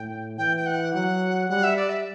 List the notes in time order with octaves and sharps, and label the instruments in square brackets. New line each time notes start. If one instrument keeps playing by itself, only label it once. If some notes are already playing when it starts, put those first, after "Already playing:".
Already playing: [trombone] A2 [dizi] G5
[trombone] E3 [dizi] G5
[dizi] G5
F#5
[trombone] F#3 [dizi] F#5
[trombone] G3 [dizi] F#5
[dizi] E5
D5
E5